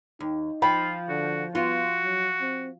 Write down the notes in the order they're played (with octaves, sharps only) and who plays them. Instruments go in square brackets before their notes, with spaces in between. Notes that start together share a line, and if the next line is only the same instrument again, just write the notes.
[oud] D#2 [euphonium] D#4
[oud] F3 [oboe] F4 [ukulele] G5 B5
[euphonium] D3 [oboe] F#4
[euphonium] B3 [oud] F4 [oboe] F#4
[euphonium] F#3
C4